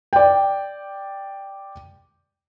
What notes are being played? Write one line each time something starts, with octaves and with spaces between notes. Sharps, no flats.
D5 G5